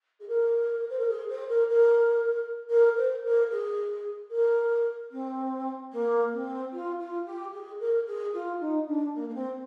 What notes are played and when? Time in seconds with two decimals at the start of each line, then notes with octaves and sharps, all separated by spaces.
0.20 G#4
0.28 A#4
0.89 C5
0.99 A#4
1.08 G#4
1.28 C5
1.49 A#4
1.69 A#4
2.70 A#4
2.96 C5
3.24 A#4
3.50 G#4
4.30 A#4
5.11 C4
5.91 A#3
6.32 C4
6.72 F4
6.99 F4
7.26 G4
7.53 G#4
7.80 A#4
8.06 G#4
8.33 F4
8.60 D#4
8.87 D4
9.14 A#3
9.28 A#3
9.34 C4